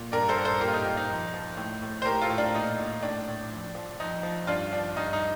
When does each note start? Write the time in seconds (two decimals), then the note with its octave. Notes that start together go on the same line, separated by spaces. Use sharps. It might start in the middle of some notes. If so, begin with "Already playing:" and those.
Already playing: A#2
0.12 G2 A#4 D5
0.28 A4 C5
0.36 G2
0.45 A4 C5
0.61 A#2 G4 A#4
0.68 F4
0.73 D#4 G4
0.85 A#2
0.97 D#4
1.10 F2
1.33 F3
1.57 A2
1.82 A2
2.02 C5
2.06 A2 G4 A#4
2.22 F4 A4
2.30 A2
2.38 D4 F4
2.54 A#2 D#4
2.79 A#2
3.03 A2 D4
3.28 A2
3.52 F2
3.75 F3
4.00 F2 D#4
4.23 F3
4.47 G2 D4 F4
4.73 F3 D4
4.96 G2 D#4
5.13 D#4